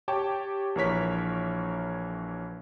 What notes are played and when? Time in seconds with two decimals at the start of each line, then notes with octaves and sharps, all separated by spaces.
0.08 G4 C#5 G5 A5 D6
0.75 A#1 E3 A#4 C#5 B6